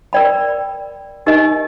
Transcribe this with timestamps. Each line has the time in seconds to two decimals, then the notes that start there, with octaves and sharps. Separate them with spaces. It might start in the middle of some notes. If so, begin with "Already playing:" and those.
0.13 A#4 D5 G5 B5
1.26 D#4 G4 A#4 D#5 G#5